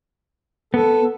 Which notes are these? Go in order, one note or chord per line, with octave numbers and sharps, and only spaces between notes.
B3 A4